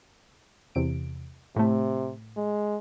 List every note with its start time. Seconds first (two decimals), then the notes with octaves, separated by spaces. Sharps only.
0.75 E2 C3 D7
1.56 A2 C3 A3
2.37 G#3